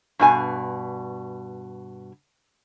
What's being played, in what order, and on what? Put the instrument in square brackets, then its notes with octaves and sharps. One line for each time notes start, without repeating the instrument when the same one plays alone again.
[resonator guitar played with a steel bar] G2 B2 G#5